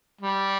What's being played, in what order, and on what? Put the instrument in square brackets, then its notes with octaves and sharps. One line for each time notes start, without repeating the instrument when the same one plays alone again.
[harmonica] G3